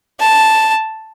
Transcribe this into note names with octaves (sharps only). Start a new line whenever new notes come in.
A5